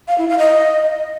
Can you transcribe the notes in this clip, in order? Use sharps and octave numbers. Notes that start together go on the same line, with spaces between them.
F5
E4
F5
D#5